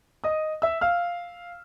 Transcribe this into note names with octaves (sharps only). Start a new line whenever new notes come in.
D#5 D#6
E5 E6
F5 F6